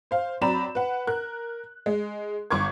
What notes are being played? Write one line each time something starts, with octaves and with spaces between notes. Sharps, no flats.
C5 F5
F#3 C4 D5 A#5 B5 E7
B4 F#5
A#4 F#6
G#3
G1 C#6 D6 G#6